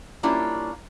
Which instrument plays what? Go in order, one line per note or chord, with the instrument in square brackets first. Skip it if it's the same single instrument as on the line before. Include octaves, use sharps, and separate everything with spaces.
[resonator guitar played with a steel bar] G3 A#3 C#4 D4 E4 F4